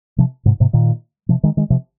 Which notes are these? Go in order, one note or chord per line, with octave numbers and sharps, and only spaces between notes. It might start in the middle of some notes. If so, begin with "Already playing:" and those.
C3 F3
G#2 C3
G#2 C3
A#2 D#3
C3 F3
D#3 G#3
D#3 G#3
C3 F3